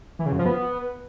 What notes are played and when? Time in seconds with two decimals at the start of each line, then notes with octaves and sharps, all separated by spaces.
0.19 E3
0.26 C#3
0.32 F#2
0.39 F3
0.46 B3